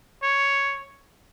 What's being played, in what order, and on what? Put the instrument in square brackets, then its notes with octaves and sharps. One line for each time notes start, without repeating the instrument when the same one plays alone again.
[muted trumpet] C#5